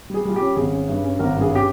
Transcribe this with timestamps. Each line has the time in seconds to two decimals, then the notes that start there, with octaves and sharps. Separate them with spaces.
0.10 G3 G#4
0.25 G3 F4
0.36 G4
0.41 C#4
0.56 G#1 G#4
0.72 C#4
0.89 G2
1.04 C#4
1.19 G#1 A#4
1.36 G2
1.41 G#4
1.51 C#4 G4